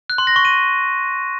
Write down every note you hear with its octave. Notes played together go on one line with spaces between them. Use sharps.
F#6
C6
A#6
C#6
D#7